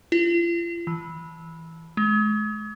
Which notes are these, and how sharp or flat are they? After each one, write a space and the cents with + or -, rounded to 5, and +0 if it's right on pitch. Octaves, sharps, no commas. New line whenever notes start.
F4 -40
E3 -10
G#3 +40